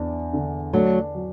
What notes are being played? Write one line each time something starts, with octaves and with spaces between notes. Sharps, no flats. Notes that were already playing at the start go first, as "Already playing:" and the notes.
Already playing: E2 D4
D3
F#3 A3 D4
F#3